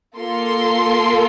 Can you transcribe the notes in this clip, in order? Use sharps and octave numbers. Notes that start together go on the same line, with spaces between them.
A#3 F4 A4 C6